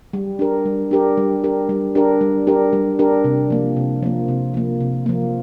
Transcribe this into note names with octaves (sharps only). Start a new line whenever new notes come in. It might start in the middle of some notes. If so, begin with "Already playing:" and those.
G3
D4 G4 A#4
G3
D4 G4 A#4
G3
D4 G4 A#4
G3
D4 G4 A#4
G3
D4 G4 A#4
G3
D4 G4 A#4
C3
F3 A#3
C3
F3 A#3
C3
F3 A#3
C3
F3 A#3